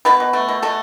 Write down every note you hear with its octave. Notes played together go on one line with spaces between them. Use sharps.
B2 B3 B4
B2
A3
B2
B2 A3 A4